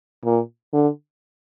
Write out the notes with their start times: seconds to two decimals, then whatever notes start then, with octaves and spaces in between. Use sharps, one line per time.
0.24 A#2
0.73 D3